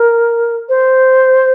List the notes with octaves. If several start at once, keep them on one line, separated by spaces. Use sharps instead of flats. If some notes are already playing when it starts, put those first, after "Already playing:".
Already playing: A#4
C5